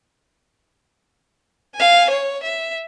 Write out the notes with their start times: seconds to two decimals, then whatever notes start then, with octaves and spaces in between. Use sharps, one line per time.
1.75 F5 G#5
2.10 C#5
2.43 E5